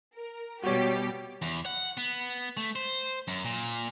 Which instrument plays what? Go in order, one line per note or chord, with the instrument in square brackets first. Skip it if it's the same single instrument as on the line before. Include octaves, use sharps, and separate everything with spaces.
[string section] A#4
[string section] B2 G3 G4 [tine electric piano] F#4 C#5
[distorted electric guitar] E2
F#5
B3
A3
C5
F#2
A#2